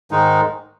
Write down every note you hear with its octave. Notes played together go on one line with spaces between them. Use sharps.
G#2 D#3 G#3 D#4